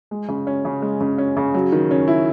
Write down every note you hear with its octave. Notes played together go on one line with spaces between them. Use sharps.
G#3
C#3
C#4
C#3
G#3
C#3
C#4
C#3
F#3
D#3
C#4
E4